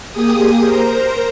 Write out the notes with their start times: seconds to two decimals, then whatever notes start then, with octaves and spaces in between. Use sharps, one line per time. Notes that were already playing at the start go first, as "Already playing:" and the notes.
0.11 A#3 G4 G#4 D#6
0.64 A#4 C5 A#5